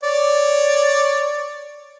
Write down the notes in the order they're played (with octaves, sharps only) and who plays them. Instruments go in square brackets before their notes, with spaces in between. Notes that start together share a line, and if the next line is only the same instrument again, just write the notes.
[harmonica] C#5 D5